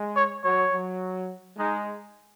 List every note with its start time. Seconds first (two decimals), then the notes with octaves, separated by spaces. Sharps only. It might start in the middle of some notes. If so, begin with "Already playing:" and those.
Already playing: G#3
0.16 C#5
0.44 F#3 C#5
0.72 F#3
1.58 G#3 D#4